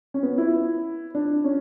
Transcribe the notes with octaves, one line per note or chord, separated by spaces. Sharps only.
C#4
B3
E4
D4
C#4